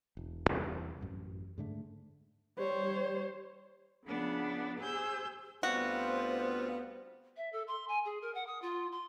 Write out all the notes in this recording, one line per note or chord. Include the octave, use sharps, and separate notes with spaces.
E1
E2 C3 E3 G3
A1 F#2
G#2 D3 A3
G3 C5 C#5
C#3 F3 B3 D4
G4 G#4 C5 E6 G6
D2 G3 B3 C4 F4 F#4 C5
E5
A4
C6
G#5
G#4
A#4
F#5
D#6
F4
C6